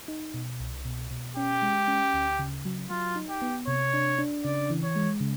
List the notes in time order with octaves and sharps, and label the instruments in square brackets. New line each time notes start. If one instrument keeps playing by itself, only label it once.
[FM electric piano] D#4
B2
C2
B2
B2
[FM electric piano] C#4 [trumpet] G4
[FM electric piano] G#3
C#4
D2
C#3
F#3
[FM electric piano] F#3 [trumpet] F4
[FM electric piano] D#4
[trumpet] G4
[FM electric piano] B3
[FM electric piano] C3 [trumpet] C#5
[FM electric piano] D4
D4
[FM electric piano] C#3 [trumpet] D5
[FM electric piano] E3
[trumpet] C#5
[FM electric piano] G#3
C#3